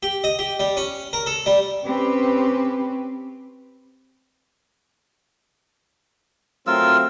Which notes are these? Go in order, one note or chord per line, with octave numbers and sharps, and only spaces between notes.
G4
D#5
G4
G3
C#4
A#4
A4
G3
C4 C#4 G4 B4
F#3 A3 C4 F4 A#4 E6